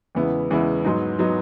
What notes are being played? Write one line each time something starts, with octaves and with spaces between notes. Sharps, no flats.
E2 C#3 G#3 B3 E4
E2 C#3 G#3 B3 E4
G#2 F#3 B3 D#4
F#3 B3 D#4